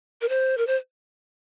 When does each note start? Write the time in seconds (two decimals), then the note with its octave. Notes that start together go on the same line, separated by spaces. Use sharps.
0.21 A#4
0.29 C5
0.58 A#4
0.67 C5